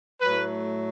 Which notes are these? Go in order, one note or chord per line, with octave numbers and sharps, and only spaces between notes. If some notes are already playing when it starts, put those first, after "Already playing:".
A2 F#3 A3 B4